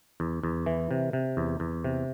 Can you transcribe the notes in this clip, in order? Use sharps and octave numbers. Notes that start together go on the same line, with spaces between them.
E2
E2
E3
C3
C3
E2
E2
C3